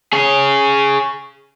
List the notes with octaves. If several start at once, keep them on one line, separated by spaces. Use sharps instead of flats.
G#4 C#5